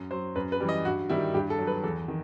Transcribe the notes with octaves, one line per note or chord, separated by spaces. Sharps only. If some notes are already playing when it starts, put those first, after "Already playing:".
Already playing: F#2
F#3 C5
F#2 B4
B4
E3 G3
D#5
G2 F#4
D#3 G3 E4
G2 G4
A4
F#3
B4
E2 A4
D#3